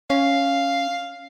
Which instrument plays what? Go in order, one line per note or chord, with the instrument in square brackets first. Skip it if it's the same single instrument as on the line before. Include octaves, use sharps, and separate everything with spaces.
[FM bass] C#4 [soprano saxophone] F5